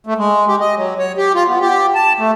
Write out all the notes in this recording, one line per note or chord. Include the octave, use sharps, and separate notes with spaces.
A3
G#3
G4
D#5
F#3
C#5
G4
F4
B3
G4
A5
A3